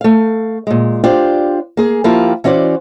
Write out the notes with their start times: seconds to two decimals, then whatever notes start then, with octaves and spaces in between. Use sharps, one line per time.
0.01 A3 F5
0.67 A#2 G#3
1.04 D4 F4 G4 C5 D5
1.77 A#3 G#4
2.04 F3 A#3 E4 F4 G4
2.44 E3 C#4 F#4 C5 D5